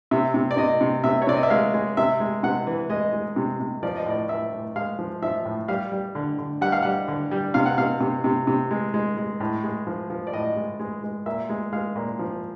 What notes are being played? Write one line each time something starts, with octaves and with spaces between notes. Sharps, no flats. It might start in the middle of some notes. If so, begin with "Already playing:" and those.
C3 E5
C3
D5
C3 D#5
C3
C3 E5
C#5
C3 D5
D#5
E5
G#3 F5
G#3
C3 E5
G#3
C3 F#5
E3
G#3 D#5
G#3
C3
C3
F3 D5
D#5
A2 D5
A2 E5
A2
G#3 F5
F3
F3 E5
A2
G3 F5
G3
D3
D3
G3 F#5
F5
G3 F#5
D3
G3
C3 F5
F#5
C3 F5
C3
C3
C3
G#3
G#3
G#3
A2
G#3
F3
F3
D5
A2 D#5
G#3
G#3
G#3
A#2 E5
G#3
G#3 F5
A#2
F3